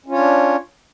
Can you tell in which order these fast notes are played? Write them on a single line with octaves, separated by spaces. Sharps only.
C#4 F4 C#5 D4